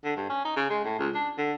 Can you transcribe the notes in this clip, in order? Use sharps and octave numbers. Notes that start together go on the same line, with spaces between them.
D3
G2
C#4
D#4
C#3
G#3
A2
C#2
D4
D3